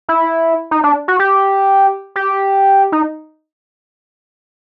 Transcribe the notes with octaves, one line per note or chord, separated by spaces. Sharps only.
E4
D#4
D4
F#4
G4
G4
D#4